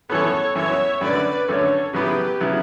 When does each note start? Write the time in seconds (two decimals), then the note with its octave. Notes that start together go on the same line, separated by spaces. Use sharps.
0.10 F#2 E3 B3 A4 C#5
0.55 F#2 E3 B3 C#5 E5
1.01 F#2 D3 A3 C#4 B4 D5
1.48 F#2 D3 A3 C#4 A4 C#5
1.93 C#3 F#3 B3 E4 G4 B4
2.41 C#3 F#3 B3 E4